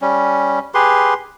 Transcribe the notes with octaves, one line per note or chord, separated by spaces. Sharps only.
G3 C#4
G4 G#4 B4 C6